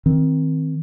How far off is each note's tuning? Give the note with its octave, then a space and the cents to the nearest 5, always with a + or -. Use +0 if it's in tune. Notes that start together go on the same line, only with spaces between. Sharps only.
D#3 +25 C4 +0